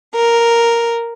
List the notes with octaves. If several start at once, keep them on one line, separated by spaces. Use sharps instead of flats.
A#4